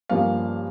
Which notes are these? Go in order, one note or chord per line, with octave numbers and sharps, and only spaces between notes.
G2 F3 A#3 C#4 F5